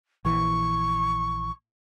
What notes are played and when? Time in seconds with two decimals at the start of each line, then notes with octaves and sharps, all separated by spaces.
0.25 A#1 E3 C#6